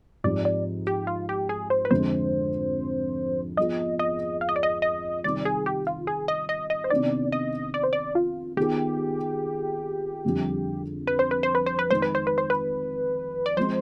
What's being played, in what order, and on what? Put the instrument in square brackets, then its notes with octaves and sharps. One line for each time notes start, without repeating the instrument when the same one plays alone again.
[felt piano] G#2 F3 C4 G4 [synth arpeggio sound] D5
[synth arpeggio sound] D5
G4
F4
G4
G#4
C5
B4
[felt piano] F2 D3 G#3 [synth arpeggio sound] C5
[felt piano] F3 B3 F4 G#4 [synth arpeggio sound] D#5
[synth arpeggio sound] D#5
F5
D#5
D5
D#5
D#5
[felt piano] C3 D#3 G3 [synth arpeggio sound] D5
[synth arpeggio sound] G#4
G4
F4
G#4
D#5
D#5
D#5
C5
[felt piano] C3 D#3 B3 D4 [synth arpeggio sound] D5
[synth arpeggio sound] D#5
D5
C5
D5
F4
[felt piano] D#3 B3 F4 G#4 [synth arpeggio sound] G4
[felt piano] F2 D3 G3
[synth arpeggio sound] B4
C5
B4
C5
B4
C5
B4
[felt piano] F2 D#3 G#3 [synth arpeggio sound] C5
[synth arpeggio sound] B4
C5
B4
C5
B4
D5
[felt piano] F3 G#3 C4 [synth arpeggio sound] C5